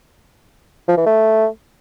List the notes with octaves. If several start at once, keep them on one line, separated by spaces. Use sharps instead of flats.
F3
E3
A3